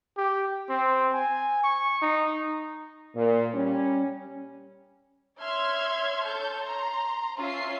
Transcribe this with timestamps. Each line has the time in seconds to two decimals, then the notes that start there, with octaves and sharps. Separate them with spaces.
0.17 G4
0.70 C4
1.14 G#5
1.63 C#6
2.02 D#4
3.16 A#2
3.54 G3 C#4
5.41 C#5 E5 C6 F6 G#6
6.24 A4 C#5 A5 G6
6.63 A#5 C6
7.39 C#4 F4 E5 C7